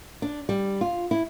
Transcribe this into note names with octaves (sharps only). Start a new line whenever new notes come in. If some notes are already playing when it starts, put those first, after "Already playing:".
D4
G3
F4
E4